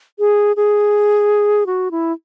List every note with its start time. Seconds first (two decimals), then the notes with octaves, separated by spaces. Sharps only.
0.19 G#4
0.56 G#4
1.66 F#4
1.91 E4